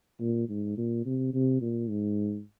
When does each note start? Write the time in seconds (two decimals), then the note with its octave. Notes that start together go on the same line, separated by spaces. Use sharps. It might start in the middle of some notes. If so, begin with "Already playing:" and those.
0.20 A#2
0.49 G#2
0.78 A#2
1.06 C3
1.34 C3
1.61 A#2
1.90 G#2